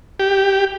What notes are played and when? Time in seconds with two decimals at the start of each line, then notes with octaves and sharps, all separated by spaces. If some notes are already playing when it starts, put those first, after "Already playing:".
0.19 G4